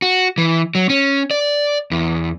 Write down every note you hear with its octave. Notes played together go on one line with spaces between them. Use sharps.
F#4
E3
F#3
C#4
D5
E2